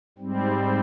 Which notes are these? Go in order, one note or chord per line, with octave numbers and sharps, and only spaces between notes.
G#2 G3 C4